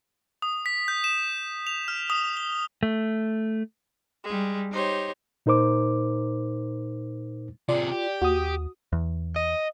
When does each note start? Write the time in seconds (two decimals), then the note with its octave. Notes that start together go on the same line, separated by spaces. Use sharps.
0.42 D#6
0.66 B6
0.88 G6
1.04 E7
1.67 F7
1.88 F6
2.10 D#6
2.37 G7
2.83 A3
4.24 G3 G#3
4.71 D#4 G4 C5 C#5
5.46 A#2 D#4 A#4 C5 D6
7.69 C3 F4 G#4 D5
7.92 G4
8.22 D#2 F#4 D#6
8.93 E2
9.36 D#5